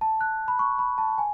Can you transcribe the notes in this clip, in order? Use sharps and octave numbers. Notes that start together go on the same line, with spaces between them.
A5
F#6
B5
C#6
B5
A5
A5
G#5